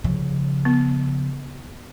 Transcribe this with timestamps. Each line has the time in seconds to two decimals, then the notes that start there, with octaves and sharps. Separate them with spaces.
0.04 C#3 F3
0.65 B3